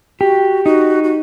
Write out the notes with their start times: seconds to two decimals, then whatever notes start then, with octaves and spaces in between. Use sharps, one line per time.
0.20 F#4 G4
0.65 D#4 F#4
1.04 F#4